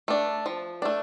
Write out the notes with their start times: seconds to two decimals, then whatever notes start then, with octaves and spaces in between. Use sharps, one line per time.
0.08 A3 D4
0.46 F3
0.82 A3 D4